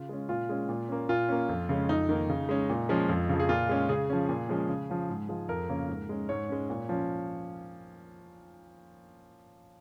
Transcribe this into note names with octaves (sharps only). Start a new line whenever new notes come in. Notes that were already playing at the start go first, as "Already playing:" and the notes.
Already playing: C#3 F4
G#3 C#4
A#2 F4
G#3 C#4
A#2
A#3 C#4
A#2 F4
A#3 C#4
F2
C#3 G#3 C#4
F2 D#4
D#3 A#3
C#3
G#3 C#4
A#2
F3 G#3 C#4
F2
C#3 F3
G#4
A#2 F4
G#3 C#4
C#3 G#4
F3 C#4
A#2
F3 G#3 C#4
C#3
F3 C#4
G#2
F3 G#3
F2 A#4
C#3 A#3 C#4
G#2
G#3 C#4
G#2 C#5
G#3 C#4
A#2
F3 C#4